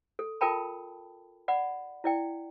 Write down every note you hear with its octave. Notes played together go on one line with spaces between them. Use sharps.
A4
F4 A4 A#4 G5 A5 B5
D5 F#5 B5
E4 D5 G5